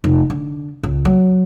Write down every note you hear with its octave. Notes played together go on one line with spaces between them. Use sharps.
F1
D3
C#2
F#3